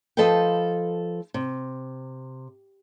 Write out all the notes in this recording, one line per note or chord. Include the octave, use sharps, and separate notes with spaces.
F3 A4 B4 D#5 F5 G5
C3